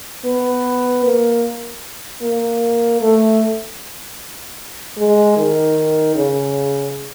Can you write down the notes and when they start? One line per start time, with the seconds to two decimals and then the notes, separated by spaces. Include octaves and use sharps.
0.25 B3
1.04 A#3
2.22 A#3
3.01 A3
4.98 G#3
5.37 D#3
6.16 C#3